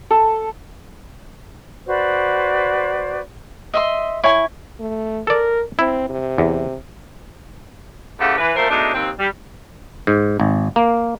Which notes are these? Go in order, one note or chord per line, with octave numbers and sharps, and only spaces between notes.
A4
F#4 B4 C5 D5
D#5 E5 C6
E4 C#5 G#5
A3
A4 A#4 D5
C4 E4
C3
E2
E2 C#3 A3 G4 F5 F#5
E3 B4
A#2 A3 A4 A#4 C5
B2 G#3 A3 D4 D#4
D#2 C4
G3
G#2
G#1
A#3